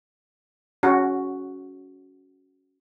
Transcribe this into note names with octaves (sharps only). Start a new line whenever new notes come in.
C#4 F#4